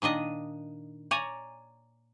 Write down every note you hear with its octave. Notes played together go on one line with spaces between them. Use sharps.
A#2 D#3 D4 D#5
C#5 D5 G#5 A#5